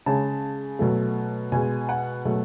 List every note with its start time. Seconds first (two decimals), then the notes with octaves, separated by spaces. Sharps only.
0.06 C#3 G#3 A5
0.79 B2 F#3 A3
1.52 B2 G#3 G#5
1.89 F#5
2.25 B2 F#3 A3